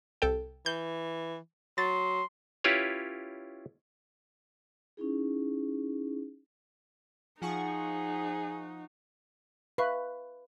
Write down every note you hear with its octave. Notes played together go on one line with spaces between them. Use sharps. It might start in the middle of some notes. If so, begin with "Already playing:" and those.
C2 A4 G5
E3 G6
F#3 C6 A6
C#4 E4 F4 G4 B4 C#5
C#4 D#4 E4 G#4
F3 D#4 G#4 F#5 C#6
B4 E5 F5 C#6